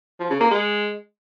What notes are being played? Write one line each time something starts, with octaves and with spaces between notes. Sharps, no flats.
F3
C#3
A#3
G#3